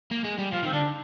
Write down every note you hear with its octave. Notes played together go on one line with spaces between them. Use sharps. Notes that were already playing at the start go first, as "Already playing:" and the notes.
A#3
G#3
G3
F3 F4
D#3 C4
D3 D4